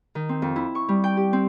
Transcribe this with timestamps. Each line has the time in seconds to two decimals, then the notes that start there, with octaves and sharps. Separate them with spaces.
0.15 D#3
0.29 C4
0.42 F2
0.56 E4
0.75 C#6
0.89 G3
1.04 G5
1.17 G4
1.33 C4